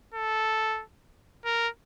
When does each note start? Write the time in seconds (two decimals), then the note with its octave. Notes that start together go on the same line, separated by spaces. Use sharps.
0.14 A4
1.45 A#4